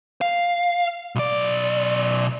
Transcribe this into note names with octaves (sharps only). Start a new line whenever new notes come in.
F5
B1 D5